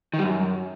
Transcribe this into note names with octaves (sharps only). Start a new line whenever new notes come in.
D#3
G3
F#2